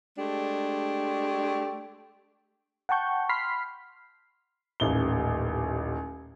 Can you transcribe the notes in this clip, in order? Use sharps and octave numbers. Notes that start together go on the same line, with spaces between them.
G#3 A3 D4 G4
F#5 G5 A5 C#6 G6
B5 C6 F6 B6 C7
D#1 A1 G7